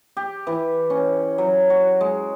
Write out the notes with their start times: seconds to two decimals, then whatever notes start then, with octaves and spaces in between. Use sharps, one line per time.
0.17 G4
0.47 E3
0.90 C#4
1.38 F#3
1.70 F#4
2.01 G#3